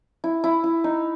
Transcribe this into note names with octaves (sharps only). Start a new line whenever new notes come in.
E4
E4
E4
D#4